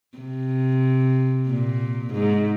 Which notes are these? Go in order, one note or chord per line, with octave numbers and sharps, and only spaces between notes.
C3
A#2
G#2